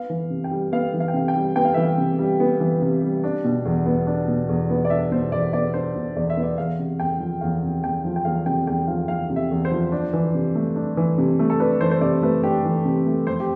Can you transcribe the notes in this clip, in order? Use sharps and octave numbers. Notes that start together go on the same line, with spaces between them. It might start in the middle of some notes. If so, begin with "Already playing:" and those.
Already playing: B3 F5
E3
C3
G5
G3
B3 F5
E3
F5
G5
C3 F5
G5
G3
B3 G5
F5
E3 E5
F5
C3
G3
B3
E3
C3
G3
D4
B2
E2
B3
D4
B2
E2
B3
D5
D4 E5
B2 C5
E2 D5
B3 D5
D4 C5
B2
E2 D5
E5
B3
D5
E2 F5
C3
E2 G5
F3
E2 F5
C3
E2 G5
F3
G5
E2 F5
C3 G5
E2 G5
F3 F5
E2 F5
C3
E5
E2
C5
F3
D4
E3
C3
A3
D4
E3
C3
A3
A4
D4 B4
E3 C5
C5
C3 D5
A3 B4
D4 G4
E3
C3
A3
F2 C5
G4